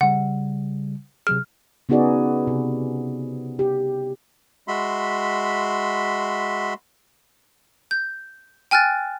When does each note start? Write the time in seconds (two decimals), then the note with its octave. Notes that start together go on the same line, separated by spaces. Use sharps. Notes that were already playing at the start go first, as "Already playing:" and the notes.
0.01 C#3 G3 F#5
1.27 C3 F#3 G#4 F6
1.89 C#3 B3 D#4 F#4 G#4 D5
2.47 C3
3.59 G4
4.68 G#3 F#4 E5 B5 C6
7.91 G6
8.71 G5 G#5 F6 F#6 A6